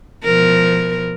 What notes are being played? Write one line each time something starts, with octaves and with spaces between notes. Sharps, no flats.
B2 F3 A#4